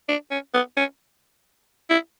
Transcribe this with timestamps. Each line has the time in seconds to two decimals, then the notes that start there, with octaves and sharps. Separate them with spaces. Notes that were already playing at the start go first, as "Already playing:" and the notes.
0.09 D4
0.31 C#4
0.54 B3
0.77 C#4
1.90 E4